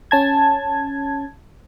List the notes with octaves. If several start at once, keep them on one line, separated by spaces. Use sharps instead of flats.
C#4 A5 G#6